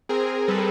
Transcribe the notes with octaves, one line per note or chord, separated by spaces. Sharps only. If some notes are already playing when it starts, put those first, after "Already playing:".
C4 G#4 A#4
G3 A4 B4